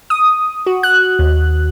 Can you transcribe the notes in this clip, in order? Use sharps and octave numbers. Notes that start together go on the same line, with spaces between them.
D#6
F#4
F#6
D#2